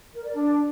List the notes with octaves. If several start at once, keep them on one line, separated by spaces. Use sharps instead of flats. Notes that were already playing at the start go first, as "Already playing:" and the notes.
A#4
D5
D4